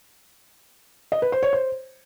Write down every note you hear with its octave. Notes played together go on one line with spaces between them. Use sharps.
D#5
B4
C5
C#5
C5